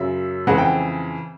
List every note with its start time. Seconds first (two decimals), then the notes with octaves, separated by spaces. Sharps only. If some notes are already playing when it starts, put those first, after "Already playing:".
Already playing: F#2 C#3 F#3 E5
0.47 F2 C#3 E3 G#3 C4 F#5
0.58 G5